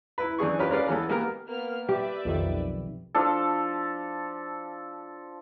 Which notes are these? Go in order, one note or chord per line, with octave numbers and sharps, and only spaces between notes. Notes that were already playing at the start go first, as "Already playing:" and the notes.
E4 B4
F#2 E3 D4 G#4 C#6
C#4 F4 G4 A#4 B4
G#3 C#4 A#4 B4 D5 F5
E3 G#3 B3 A4
G#3 A#3 B3 G4 A#4
A#3 B3 F6
G4 B4 D5 E5
B1 F2 D#3
F3 D4 A4